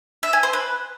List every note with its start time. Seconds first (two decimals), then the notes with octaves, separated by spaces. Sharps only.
0.23 E5
0.33 G#5
0.43 C5
0.53 B4